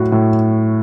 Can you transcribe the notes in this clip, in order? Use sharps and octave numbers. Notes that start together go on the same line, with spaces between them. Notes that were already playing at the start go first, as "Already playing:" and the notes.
Already playing: A2 F#3 F#4
A2